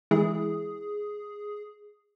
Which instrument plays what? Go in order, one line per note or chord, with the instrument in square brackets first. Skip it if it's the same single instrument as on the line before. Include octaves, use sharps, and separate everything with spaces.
[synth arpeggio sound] E3 G#3 E4 [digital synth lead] G#4